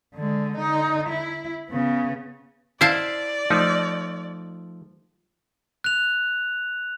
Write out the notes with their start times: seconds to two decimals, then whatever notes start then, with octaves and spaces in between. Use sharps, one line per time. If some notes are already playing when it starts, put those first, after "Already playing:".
0.15 D3 G#3
0.57 D3 D#4
1.09 E4
1.69 C#3 B3
2.81 E4 C5 D5 F5 A5
3.50 F3 A3 D#4
5.84 F#6 F7